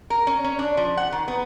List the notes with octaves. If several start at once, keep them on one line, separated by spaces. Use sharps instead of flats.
A#4
C#4
C#4
D4
F3
F#5
D#3
B3